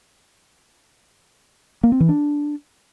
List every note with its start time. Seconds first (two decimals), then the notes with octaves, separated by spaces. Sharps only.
1.83 A#3
1.92 C4
2.00 E3
2.09 D4